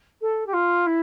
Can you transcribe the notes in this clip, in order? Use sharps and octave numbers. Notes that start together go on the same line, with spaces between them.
A4
G4
F4
E4